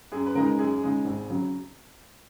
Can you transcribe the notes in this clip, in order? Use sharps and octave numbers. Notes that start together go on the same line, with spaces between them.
F#2 G#4
B4
C#3 G#3 D#4 A#4
F#2 G#4
C#3 G#3 D#4
G#1
C#3 F#3